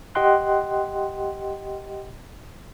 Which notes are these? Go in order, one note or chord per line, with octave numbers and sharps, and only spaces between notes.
G4 D#5 F#5 G5 C6 F#6